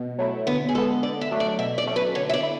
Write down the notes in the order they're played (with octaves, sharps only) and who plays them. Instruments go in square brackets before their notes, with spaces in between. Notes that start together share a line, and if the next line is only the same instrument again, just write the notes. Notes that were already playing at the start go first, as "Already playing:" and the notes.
Already playing: [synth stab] B2
F#3 A3 E4
[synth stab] D3 [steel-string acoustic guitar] B3
[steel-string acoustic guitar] G#4
[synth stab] G#3 B3 [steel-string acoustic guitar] A4
[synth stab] D3 [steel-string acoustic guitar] D5
[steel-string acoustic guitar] E5
[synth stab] F#3 A3 D4
[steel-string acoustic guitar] D5
[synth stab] B2 [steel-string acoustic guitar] E5
[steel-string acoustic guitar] D5
[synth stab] F#3 A3 C#4
[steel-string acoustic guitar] B4
[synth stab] D3 [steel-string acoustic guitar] C#5
[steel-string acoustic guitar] E5
D5
[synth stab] E4